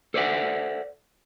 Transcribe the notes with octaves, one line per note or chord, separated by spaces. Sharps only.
A4 C5 D5 E5 F#5